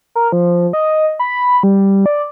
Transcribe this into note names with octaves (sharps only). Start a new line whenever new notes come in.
A#4
F3
D#5
B5
G3
D5